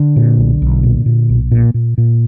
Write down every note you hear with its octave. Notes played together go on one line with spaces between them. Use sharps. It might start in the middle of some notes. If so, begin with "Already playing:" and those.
Already playing: D3
A#2
B1
B1
A#2
A#2
B1
A#2
A#2
A#2